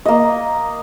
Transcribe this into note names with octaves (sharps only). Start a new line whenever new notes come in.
A#3 D#5